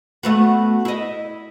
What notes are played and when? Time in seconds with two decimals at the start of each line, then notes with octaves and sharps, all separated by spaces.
0.23 A3 B3 F#4
0.85 E4 D#5